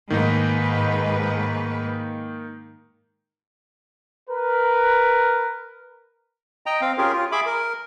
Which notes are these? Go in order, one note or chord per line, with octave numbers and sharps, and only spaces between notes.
G#2 D#3 G#3 A#3 D#4 B4
A#4 B4
D#5 G5 A#5
C4 F5
C#4 F4 G4 G#4 A#4
F4
G#4 E5 B5 D6
A#4